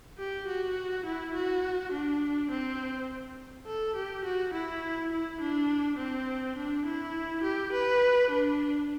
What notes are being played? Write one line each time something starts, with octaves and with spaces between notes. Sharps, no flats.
G4
F#4
E4
F#4
D4
C4
A4
G4
F#4
E4
E4
D4
C4
D4
E4
G4
B4
D4